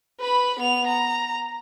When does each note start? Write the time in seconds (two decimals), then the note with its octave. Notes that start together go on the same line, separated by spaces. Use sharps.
0.20 B4 B5
0.59 B3 F7
0.88 A#5